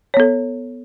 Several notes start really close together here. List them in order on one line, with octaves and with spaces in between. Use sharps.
C#5 B3 A4